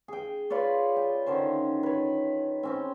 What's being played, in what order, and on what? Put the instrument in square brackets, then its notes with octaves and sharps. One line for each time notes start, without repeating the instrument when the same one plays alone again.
[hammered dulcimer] G#4 G5
F4 B4 C#5 D5
G5
D3 D#3 C#4 C5
B4 C#5
C4 C#4 G5